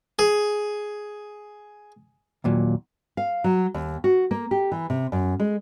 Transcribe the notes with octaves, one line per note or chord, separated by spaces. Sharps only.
G#4
D#2 A#2 F#3
F5
F#3
D#2
F#4
A#3
G4
E3
C3
F#2
G#3